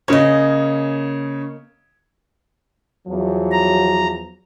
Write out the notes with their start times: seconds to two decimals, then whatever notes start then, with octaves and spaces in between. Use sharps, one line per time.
0.08 C#3 A#3 C#5 D#5
3.08 E2 F3 F#3
3.52 A#5